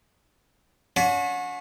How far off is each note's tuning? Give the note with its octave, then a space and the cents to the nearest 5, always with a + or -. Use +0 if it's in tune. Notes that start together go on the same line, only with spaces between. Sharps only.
C#4 +45 F#4 -30